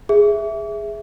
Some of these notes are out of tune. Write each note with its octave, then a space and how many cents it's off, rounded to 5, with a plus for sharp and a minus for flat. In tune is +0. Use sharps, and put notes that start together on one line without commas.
G#4 -5 E5 +0